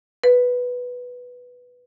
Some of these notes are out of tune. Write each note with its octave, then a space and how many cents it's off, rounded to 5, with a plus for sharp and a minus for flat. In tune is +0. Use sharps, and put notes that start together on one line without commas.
B4 +0